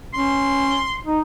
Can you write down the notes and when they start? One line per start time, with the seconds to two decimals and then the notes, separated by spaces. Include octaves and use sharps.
0.14 C#4 C6
1.06 D#4